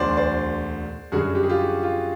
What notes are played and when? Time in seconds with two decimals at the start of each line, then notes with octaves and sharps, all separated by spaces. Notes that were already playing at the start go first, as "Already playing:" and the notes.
Already playing: E1 D2 D3 F#3 C5 D5
0.17 C5 D5
1.12 F#2 D3 G3 F#4 G#4
1.35 G4
1.43 G#4
1.50 F4 G4
1.59 F#4
1.83 F4